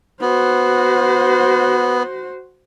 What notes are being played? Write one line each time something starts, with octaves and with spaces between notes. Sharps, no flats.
B3 F#4 C5